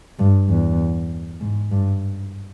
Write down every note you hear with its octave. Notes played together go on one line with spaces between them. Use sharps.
G2
E2
G#2
G2